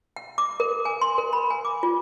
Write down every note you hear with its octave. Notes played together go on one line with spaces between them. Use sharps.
G5
D6
A#4
G#5
C6
A#4
B5
G#5
D6
F4